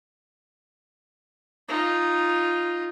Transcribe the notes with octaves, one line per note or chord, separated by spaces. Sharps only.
D#4 F4